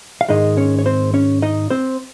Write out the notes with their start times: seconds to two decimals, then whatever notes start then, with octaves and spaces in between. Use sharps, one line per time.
0.21 F5
0.29 G#2 D#3 G#3 D#4 D#5
0.57 C#4 C#5
0.79 C#5
0.86 C4 C5
1.14 C#4 C#5
1.42 D#4 D#5
1.70 C4 C5